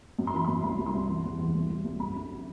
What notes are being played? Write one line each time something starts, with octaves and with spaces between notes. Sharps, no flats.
F#2
C6
E3 B5
F#2 C6
C2 B5
C2
C6
C2
E3
E2
E2
C2
C2
C2
F#2 B5
D3